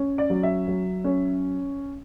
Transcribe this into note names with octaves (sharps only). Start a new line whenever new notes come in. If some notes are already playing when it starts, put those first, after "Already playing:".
Already playing: C#4
D5
F#3
E5
F#3
C#4